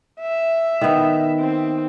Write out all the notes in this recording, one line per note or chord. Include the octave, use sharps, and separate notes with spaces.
E5
D#3 B3
C4